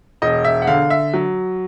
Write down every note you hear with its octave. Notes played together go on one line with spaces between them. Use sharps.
E1 D#5
E5
F#5
D3 F5
E5
F#3